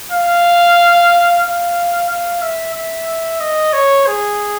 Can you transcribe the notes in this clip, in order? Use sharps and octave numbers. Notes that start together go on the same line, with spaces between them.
F5
F5
F5
E5
E5
D#5
C#5
G#4